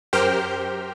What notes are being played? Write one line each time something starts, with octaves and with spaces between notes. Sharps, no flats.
F#2 G4 A#4 C5 G5 F6